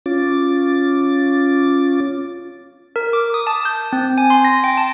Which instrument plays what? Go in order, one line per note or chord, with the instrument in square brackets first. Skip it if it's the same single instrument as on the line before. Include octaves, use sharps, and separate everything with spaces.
[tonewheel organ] C#4 F4 D6 A6
[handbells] A#4
D6
D#6
A5
G6
C4
G#5
C6
A#6
G5
A5